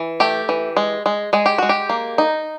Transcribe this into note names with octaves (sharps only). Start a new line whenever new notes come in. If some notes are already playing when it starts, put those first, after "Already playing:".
Already playing: E3
A3 G4
E3
G#3
G#3
G#3 G#4
G4
G#3 F#4
G4
A#3
D#4